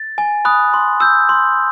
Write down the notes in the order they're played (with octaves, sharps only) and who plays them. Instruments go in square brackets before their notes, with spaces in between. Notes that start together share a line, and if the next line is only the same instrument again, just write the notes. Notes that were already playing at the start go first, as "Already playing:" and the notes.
Already playing: [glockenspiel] A6
G#5
B5 D#6 F#6
C6
E6 G6
C6